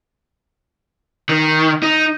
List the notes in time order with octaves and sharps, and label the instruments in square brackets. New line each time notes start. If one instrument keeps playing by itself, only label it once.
[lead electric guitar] D#3
D#4